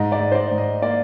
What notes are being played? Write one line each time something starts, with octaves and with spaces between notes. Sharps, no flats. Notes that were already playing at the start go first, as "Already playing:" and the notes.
Already playing: G#2 D#5
D5
G#2
C5
D5
G#2
D#5
A#3 D5